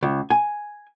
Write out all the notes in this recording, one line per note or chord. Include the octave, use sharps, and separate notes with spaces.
C#2
G#5